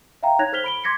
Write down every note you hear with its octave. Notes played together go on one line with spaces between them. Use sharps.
E5 F5 G5 A#5
D#4 C#5 F#6 G#6 A#6 F7
A4 C5 F6 B6 F7 G7
B5 D7 G7
C6 D6 G#6 A#6 B6 C#7